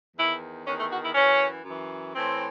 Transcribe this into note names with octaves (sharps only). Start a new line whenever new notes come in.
E2 D#3 E4
E2 D#3 C#4
A3
F#4
E4
F#2 E3 C#4
F#2 E3
A2 E3 C4